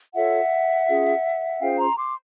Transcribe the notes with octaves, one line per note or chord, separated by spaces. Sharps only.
F4 A4 C#5 E5 F#5
C#4 F4 G#4
C#4 F4 G#4 C5 F5 G5
A#5 C6
C6 D6